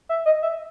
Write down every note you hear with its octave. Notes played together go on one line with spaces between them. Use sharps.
E5
D#5
E5